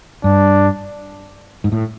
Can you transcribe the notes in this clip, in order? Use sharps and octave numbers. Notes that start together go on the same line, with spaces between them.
G2 D4
G#2
A2